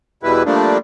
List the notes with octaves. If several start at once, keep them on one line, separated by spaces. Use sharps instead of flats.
E2 B2 G3 E4 B4
F3 G3 A3 A#3 D4